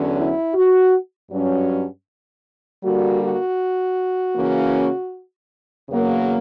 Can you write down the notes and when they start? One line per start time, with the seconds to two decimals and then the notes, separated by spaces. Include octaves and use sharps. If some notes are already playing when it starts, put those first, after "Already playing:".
Already playing: E2 D3 F#3 C#4
0.16 E4
0.54 F#4
1.31 G2 F#3 C#4
2.83 D3 G3 A#3 F#4
3.21 F#4
4.36 C#3 E3 A#3 C#4
5.89 E2 C#3 F#3 A#3